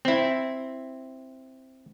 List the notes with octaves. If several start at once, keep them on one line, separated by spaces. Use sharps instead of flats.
C4 E4